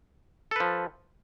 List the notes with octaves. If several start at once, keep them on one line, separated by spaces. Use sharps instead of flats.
F3 A4 B4